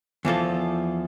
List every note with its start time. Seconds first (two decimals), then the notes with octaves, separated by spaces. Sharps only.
0.25 E2 E3 F3 A4